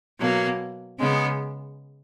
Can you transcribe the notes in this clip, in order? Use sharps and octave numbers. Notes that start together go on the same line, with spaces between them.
B2 F#3 A#3
C#3 G#3 B3